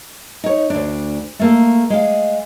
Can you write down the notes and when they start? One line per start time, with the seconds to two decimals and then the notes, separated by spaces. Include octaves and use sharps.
0.44 D#4 C#5
0.70 D2 D4
1.39 A3 A#3 A4
1.90 G#3 F5